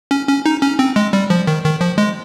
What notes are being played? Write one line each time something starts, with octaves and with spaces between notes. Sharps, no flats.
C#4
C#4
D#4
C#4
C4
G#3
G3
F3
D#3
D#3
F3
G#3